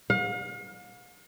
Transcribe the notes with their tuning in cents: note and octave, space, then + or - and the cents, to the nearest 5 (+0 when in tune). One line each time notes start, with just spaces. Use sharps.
F5 +45